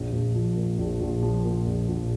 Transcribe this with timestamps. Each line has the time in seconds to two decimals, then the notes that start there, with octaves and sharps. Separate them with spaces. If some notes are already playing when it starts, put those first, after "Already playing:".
Already playing: A#1
0.12 A#1
0.34 F3
0.56 A#2
0.78 A#1
1.00 A#1
1.22 F3
1.44 A#2
1.66 A#1
1.88 A#1